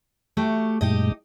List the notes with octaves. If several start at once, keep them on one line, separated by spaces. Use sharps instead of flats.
A3 F#4 G4
F#2 A#2 G#3 D#4 G4 D#5